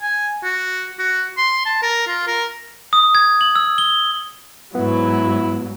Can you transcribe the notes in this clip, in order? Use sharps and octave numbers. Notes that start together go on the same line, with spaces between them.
G#5
F#4
F#4
C6
A5
A#4
F4
A#4
D#6
G#6
F#7
E6
G7
G#2 F#3 B3 E4